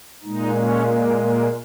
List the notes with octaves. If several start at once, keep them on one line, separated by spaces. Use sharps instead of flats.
A#2 G#3 D#4
C#4
A#3
A#3